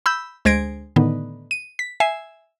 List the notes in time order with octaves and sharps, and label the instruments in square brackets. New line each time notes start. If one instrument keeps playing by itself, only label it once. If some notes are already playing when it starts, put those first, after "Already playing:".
[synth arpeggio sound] B5 E6 G6
D2 G#3 C5 G#6 A#6 D7
A2 D3 D#3 B3 D#4
D#7
B6
E5 G#5 C7